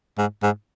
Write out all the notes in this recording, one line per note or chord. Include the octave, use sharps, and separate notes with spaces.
G#2
G#2